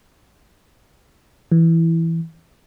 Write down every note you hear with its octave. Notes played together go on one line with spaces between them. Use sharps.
E3